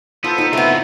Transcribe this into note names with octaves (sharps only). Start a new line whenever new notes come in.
B3 F4 A4 C5
D#4 A5
C#3 A3 B3 C4 E4